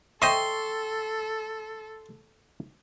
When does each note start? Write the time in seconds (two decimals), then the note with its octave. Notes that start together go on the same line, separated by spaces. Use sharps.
0.22 A4 C5 D#5 E5 G5 C6 C#6